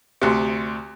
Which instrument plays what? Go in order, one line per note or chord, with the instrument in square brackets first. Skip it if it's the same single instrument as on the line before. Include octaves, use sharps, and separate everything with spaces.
[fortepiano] D2 C3